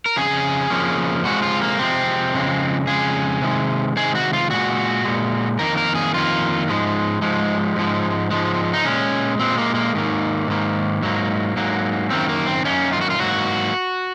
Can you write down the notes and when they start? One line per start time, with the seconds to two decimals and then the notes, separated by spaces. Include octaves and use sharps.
0.06 A#4
0.16 F2 C#3 G#4
0.70 F2 C#3 F3 A#3
1.24 C3 F3 G#3 F#4
1.42 F4
1.62 A#3
1.79 C3 F3 G#3 C4
2.33 F2 C#3 G#3
2.87 F2 C#3 G#3 G#4
3.42 C3 D#3 G#3
3.96 C3 D#3 G#3 G#4
4.15 F#4
4.33 F4
4.51 A#2 G#3 F#4
5.05 A#2 G#3
5.59 F2 D#3 A#3 A#4
5.77 A#4
5.95 G#4
6.14 F2 D#3 A#3 F4
6.67 G#2 F3 G#3
7.22 G#2 F3 G#3
7.76 G#2 F3 G#3
8.31 G#2 F3 G#3
8.74 D#4
8.84 A#2 G#3 C#4
9.39 A#2 G#3 C4
9.58 A#3
9.75 A#3
9.94 G#2 D#3 A#3
10.47 G#2 D#3 A#3
11.02 G#2 F#3 A#3
11.56 G#2 F#3 A#3
12.10 F#2 D#3 A#3 C4
12.29 A#3
12.47 C4
12.65 F#2 D#3 A#3 C#4
12.93 F4
13.01 F#4
13.10 F4
13.19 G#2 F#3 A#3 F#4